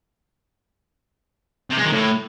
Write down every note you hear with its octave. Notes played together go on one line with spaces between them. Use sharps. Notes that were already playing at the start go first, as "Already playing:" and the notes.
C3
G#3
D#3
A2